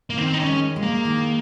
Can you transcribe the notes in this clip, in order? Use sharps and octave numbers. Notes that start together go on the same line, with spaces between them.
A#3
D#3 C4
D#4
C#4
G#3
G#3
A#3
D#3